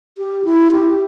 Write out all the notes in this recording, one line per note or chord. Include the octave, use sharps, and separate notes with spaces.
G4
E4
G4